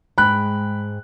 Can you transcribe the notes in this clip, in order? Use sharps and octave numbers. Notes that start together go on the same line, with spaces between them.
G#2 G#3 G5 B5 F#6